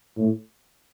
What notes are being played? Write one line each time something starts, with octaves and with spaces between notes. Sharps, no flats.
A2